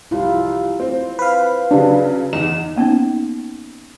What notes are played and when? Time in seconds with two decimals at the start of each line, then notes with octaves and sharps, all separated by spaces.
0.11 C2 E4 F4
0.80 C4
1.19 B4 F5
1.71 C#3 F#3 D4
2.33 E2 D#4 E7
2.76 A#3 B3 C#4 D#4